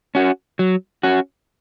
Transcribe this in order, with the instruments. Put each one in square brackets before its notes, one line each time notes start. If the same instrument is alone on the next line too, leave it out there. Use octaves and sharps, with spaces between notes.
[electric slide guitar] C#4 F#4
F#3
C#4 F#4